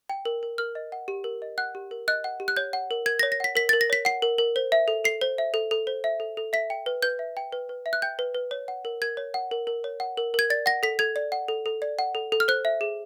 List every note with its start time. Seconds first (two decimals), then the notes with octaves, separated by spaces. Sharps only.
0.09 G5
0.25 A#4
0.43 A#4
0.58 A#4 F6
0.75 D#5
0.92 F#5
1.08 G4
1.24 A#4
1.42 D#5
1.58 F#5 F#6
1.75 G4
1.91 A#4
2.08 D#5 F#6
2.24 F#5
2.40 G4
2.48 F#6
2.56 C#5 G6
2.73 F#5
2.91 A#4
3.06 A#4 G#6
3.19 A#6
3.23 C#5
3.32 A#6
3.40 F#5 B6
3.55 A#4 B6
3.69 A#4 A6
3.81 A#6
3.90 C#5 B6
4.05 F#5 C7
4.22 A#4
4.38 A#4
4.56 C5
4.72 E5
4.88 A4
5.04 A4 C7
5.21 C5
5.38 E5
5.54 A4
5.71 A4
5.87 C5
6.04 E5
6.20 A4
6.37 A4
6.53 E5 B6
6.70 G5
6.86 B4
7.02 B4 G6
7.19 E5
7.37 G5
7.52 B4
7.69 B4
7.86 E5
7.93 F#6
8.02 G5 G6
8.19 B4
8.35 B4
8.51 C#5
8.68 F#5
8.85 A#4
9.02 A#4 G#6
9.17 C#5
9.34 F#5
9.51 A#4
9.67 A#4
9.84 C#5
10.00 F#5
10.17 A#4
10.34 A#4 G#6
10.50 D5 A6
10.66 F#5 A#6
10.83 A4 B6
10.99 A4 G#6
11.16 D5
11.32 F#5
11.48 A4
11.66 A4
11.82 D5
11.99 F#5
12.15 A4
12.32 A4
12.40 F6
12.48 C5 F#6
12.65 E5
12.81 G#4